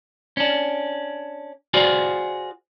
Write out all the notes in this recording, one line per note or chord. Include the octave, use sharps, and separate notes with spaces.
C#4 D4
F4 F#4 G#4 C5 D5